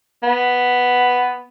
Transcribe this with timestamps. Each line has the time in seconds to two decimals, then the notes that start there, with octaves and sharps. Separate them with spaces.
0.23 B3